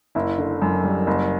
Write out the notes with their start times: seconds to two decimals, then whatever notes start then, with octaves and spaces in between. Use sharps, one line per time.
0.15 F#1 E4
0.38 D3
0.62 F#2
0.84 G3
1.07 F#1